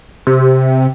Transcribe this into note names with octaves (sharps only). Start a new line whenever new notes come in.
C3